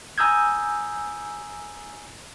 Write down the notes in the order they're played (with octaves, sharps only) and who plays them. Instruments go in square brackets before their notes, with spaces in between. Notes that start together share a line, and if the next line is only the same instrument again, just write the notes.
[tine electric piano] G#5 A#5 D#6 E6 G6 G#6